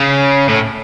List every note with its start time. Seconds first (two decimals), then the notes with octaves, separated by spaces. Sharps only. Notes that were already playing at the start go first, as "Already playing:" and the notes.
Already playing: C#3
0.49 A2